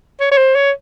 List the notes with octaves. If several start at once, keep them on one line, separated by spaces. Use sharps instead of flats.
C#5
C#5
C5
C#5